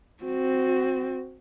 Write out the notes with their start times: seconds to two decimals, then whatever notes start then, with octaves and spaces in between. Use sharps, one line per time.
0.23 C4 F#4